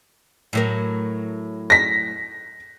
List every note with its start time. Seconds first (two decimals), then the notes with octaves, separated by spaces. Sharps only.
0.53 A2 F#3 A#4
1.70 A#6 B6